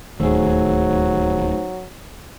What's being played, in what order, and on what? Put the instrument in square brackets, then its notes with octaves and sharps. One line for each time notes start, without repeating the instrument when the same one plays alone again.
[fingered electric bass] D1 D#2 [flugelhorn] F#3 [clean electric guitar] A3 G#4 [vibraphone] D#4 C5